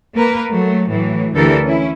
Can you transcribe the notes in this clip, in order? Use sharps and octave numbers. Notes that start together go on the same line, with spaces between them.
A#3 A#4 B4
F#3 A3
A2 E3 F#3
D2 D3 E3 G4 A4 A#4
C#4 E4